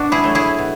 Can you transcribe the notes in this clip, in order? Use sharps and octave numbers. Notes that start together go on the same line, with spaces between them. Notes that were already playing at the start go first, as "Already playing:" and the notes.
Already playing: B2 D4 F#4
E4 G#4
F#3 A3
E4 G#4
B2